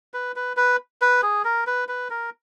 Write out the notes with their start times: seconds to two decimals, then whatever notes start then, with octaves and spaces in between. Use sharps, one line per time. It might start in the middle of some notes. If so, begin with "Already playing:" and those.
0.14 B4
0.36 B4
0.57 B4
1.02 B4
1.23 G#4
1.44 A#4
1.67 B4
1.88 B4
2.10 A#4